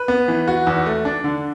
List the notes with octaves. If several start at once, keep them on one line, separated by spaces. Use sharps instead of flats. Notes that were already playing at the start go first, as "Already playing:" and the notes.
Already playing: B4
B3
E3
F#4
E2
A3
D4
D3